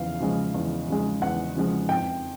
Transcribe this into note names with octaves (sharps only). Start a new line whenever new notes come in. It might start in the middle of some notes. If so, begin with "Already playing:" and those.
Already playing: E2 C#3 F3 F5
C#3 F3 G#3
E2
C#3 F3 G#3
E2 F#5
C#3 F3 G#3
F2 G5